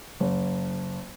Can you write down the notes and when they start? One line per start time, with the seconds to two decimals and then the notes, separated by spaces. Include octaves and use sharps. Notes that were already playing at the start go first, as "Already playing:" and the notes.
0.20 F#1